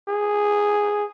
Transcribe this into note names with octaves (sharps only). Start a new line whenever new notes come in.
G#4